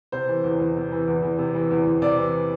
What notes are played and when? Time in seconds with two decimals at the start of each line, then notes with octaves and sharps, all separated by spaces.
0.12 C3 C5
0.28 E3
0.44 E2
0.60 E2
0.76 C3
0.92 E3
1.08 E2
1.23 E2
1.38 C3
1.54 E3
1.71 E2
1.86 E2
2.02 C3 D5
2.18 E3